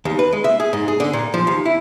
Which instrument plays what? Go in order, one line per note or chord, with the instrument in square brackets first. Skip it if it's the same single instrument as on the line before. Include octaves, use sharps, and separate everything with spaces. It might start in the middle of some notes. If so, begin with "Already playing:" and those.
[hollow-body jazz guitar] D#2
B4
G#3
E5
G#4
G#2
G#4
D3
A#2
F3
D#2
E4